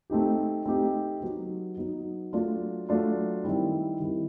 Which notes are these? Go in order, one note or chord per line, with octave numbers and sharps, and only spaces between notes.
A3 C4 D#4 G4
A3 C4 D#4 G4
F#3 B3 D#4
F#3 B3 D#4
F#3 A3 D4 F4
F#3 A3 D4 F4
D#3 G3 C4 E4
D#3 G3 C4 E4